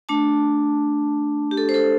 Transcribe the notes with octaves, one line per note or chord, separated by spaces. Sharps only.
A3 D4 A5 D6
G4
A4
C5
A4